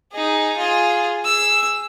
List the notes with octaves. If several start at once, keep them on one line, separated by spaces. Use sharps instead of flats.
D#4 G#4
F4 G#4
G#4 E6